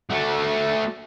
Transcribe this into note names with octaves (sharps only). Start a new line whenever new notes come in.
A3 F#4